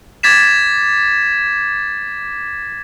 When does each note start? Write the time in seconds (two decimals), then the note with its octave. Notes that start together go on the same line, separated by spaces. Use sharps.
0.23 D6 G#6 A6 B6 E7